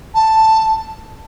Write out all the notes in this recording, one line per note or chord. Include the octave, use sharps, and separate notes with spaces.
A5